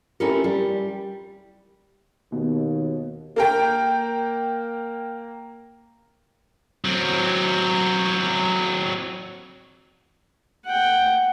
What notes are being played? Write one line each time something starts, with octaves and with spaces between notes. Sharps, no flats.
C#4 E4 F4 G4 A4 A#4
G3
D#2 B2
A#3 A#4 G5
F#3 C4
F#5 G5